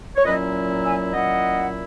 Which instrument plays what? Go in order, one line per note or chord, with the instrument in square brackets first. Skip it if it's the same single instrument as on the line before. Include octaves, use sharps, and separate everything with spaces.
[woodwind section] C#5
A#2 F#3 C#4 E4 B4 D#5
E5 G#5
A#2 F#3 C#4 E4 D#5 F#5